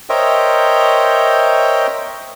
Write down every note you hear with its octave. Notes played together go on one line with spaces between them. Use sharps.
A#4 C5 C#5 D#5 E5 G5